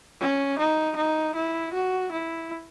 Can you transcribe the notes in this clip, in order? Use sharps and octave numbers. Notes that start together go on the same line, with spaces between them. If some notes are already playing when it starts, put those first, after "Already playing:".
C#4
D#4
D#4
E4
F#4
E4